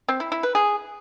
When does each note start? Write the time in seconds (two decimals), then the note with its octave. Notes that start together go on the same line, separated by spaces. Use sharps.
0.08 C4
0.20 E4
0.32 E4
0.43 B4
0.55 G#4